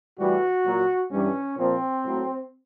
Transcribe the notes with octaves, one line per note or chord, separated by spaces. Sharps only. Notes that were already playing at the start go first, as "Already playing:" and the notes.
A2 E3 G3 F#4
A#2 F#3
G2 E3 G3 C#4
A#2 F3 C4
A2 F#3